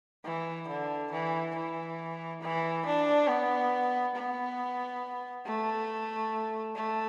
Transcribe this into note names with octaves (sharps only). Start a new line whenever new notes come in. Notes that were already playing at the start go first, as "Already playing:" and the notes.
E3
D3
E3
E3
E3
D4
B3
B3
A3
A3